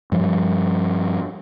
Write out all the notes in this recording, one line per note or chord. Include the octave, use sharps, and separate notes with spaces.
G2 F3 G3